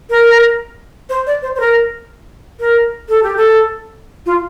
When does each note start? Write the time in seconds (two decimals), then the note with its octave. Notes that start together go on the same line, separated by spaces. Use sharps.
0.10 A#4
1.09 C5
1.27 D5
1.42 C5
1.56 C5
1.60 A#4
2.60 A#4
3.09 A4
3.23 G4
3.37 A4
4.26 F4